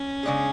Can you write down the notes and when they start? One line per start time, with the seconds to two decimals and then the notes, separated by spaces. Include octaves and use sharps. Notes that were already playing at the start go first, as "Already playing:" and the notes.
Already playing: C#4
0.23 C#3 G#3 D4 G#4